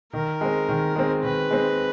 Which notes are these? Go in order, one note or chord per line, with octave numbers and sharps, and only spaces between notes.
D#3 A#4
G#3 C4
D#3
G#3 C4
D#3 B4
G#3 C4